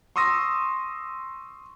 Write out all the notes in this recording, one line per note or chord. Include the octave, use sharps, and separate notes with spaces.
C6 C#6 D#6 E6 A#6